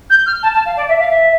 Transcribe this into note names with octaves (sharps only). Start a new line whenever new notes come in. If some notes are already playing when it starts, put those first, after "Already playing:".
G6
F6
A5
A5
F5
D5
E5
F5
E5